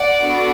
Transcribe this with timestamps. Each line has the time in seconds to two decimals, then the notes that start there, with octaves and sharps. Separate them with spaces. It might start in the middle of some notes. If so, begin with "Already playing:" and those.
Already playing: D5 F#5
0.21 B3 D4 F#4 A4